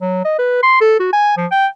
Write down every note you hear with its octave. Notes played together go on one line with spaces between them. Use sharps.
F#3
D#5
B4
C6
A4
F#4
G#5
F3
G5